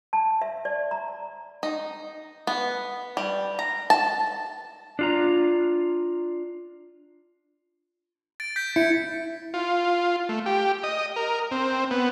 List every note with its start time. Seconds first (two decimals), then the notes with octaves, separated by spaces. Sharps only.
0.13 A5
0.42 E5
0.65 D5
0.91 A#5
1.63 D#4
2.47 B3
3.17 G3
3.59 A#5
3.90 A5
4.99 D4 F4 A#5
8.40 A6 D7
8.56 G6 B6
8.76 E4 C#7
9.54 F4
10.29 A3
10.46 G4
10.83 D#5
11.16 A#4
11.52 C4
11.91 B3